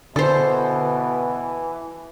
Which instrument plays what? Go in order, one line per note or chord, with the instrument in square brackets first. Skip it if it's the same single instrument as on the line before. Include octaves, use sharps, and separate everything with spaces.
[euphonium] B2 [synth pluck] D3 [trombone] E3 [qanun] A4 C5